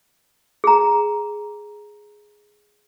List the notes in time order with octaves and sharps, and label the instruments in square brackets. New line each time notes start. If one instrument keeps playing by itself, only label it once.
[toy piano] G#4 A#5